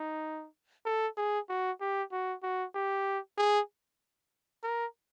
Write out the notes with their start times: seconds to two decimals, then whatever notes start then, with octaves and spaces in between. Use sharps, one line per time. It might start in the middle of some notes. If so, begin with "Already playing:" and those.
Already playing: D#4
0.85 A4
1.17 G#4
1.49 F#4
1.81 G4
2.12 F#4
2.43 F#4
2.75 G4
3.38 G#4
4.64 A#4